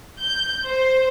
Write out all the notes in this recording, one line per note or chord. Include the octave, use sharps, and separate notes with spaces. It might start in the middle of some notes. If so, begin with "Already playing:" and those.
G6
C5